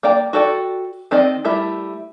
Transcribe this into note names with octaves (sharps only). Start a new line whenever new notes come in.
A#3 D5 G5 A#5
F#4 A4 D5 G5
D#3 C4 A#4 D5 D#5
G3 A3 E4 A#4 E5